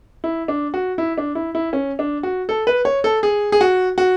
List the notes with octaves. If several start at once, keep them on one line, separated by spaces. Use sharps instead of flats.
E4
D4
F#4
E4
D4
E4
E4
C#4
D4
F#4
A4
B4
C#5
A4
G#4
G#4
F#4
F#4